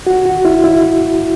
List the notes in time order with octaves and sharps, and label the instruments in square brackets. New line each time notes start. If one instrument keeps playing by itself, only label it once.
[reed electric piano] F#4
F#4
E4
E4